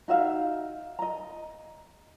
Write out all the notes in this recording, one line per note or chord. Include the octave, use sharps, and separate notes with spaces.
D#4 F#4 E5 F5
D#5 A#5